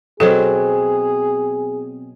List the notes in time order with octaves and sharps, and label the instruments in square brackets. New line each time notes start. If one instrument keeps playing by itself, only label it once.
[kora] B2 F#3 C4 [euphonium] G#4 [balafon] A4